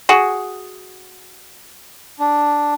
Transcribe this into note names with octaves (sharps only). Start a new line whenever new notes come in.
F#4 G#4
D4